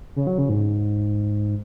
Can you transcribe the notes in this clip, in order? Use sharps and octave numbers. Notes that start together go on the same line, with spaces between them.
C#3
F#3
C#3
G#2